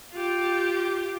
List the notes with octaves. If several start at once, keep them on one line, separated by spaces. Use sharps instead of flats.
F4 G4